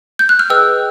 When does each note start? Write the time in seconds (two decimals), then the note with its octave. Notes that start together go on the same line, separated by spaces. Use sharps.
0.19 G6
0.29 F#6
0.39 F6
0.50 G#4 B4 D#5 G5 E6